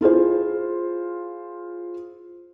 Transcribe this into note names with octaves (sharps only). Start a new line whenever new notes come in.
E4 F4 G#4 C5